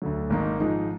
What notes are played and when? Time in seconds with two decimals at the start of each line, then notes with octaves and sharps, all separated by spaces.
0.02 D2 D3 F#3
0.30 G#1 G#2 D#3 A#3 D#4
0.60 G#2 F3 G#3 D#4